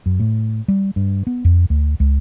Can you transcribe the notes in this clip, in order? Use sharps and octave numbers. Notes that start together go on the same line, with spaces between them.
F#2
A2
G3
G2
B3
F2
D2
C#2